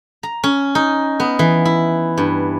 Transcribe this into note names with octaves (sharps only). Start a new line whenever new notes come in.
A#5
C#4
D#4
B3
E3
E4
G2